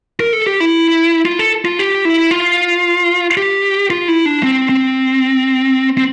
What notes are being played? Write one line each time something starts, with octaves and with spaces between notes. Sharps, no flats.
A#4
A4
G4
E4
F4
A4
F4
G4
E4
F4
G4
F4
E4
D4
C4
C4
C4